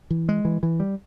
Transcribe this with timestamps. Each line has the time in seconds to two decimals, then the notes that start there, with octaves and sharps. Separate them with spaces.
0.10 E3
0.29 G#3
0.45 E3
0.63 E3
0.80 G3